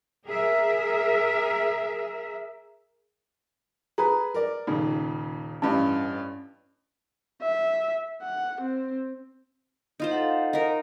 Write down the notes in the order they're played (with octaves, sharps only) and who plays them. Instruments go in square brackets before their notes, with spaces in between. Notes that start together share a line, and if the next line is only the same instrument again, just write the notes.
[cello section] G#4 A#4 E5
[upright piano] G#4 B4 [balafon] A#5
[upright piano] A#4 D5
[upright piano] D#1 C#3 [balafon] D#4
[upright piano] A1 G2 [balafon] C#4
[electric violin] E5
F#5
C4
[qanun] D#4 F4 C5
[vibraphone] A4 F5 F#5
[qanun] D#4 A#4